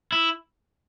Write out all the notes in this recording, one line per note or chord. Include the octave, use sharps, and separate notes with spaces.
E4